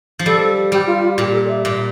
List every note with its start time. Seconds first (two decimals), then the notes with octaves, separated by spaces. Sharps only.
0.19 F3
0.26 G3 A4
0.72 G3 G4
0.87 F4
1.03 F4
1.18 A#2 G4
1.33 A4
1.45 D5
1.49 E5
1.65 A#2